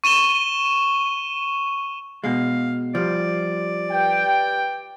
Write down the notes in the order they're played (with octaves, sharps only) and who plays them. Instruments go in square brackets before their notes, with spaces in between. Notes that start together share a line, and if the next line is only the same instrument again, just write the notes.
[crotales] C#6 D#7 E7 G7
[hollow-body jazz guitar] B2 G#3 [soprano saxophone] F5
[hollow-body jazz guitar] F3 G3 [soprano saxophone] D5
[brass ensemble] G4 B4 G5